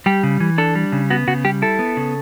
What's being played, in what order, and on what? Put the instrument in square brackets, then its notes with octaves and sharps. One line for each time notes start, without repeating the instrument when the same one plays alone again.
[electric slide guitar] G3 G4
C#3
E3
D4 A4
G3
C#3
B3 F#4
C#3 F#4
G3 G4
E4 A4
B3
C#3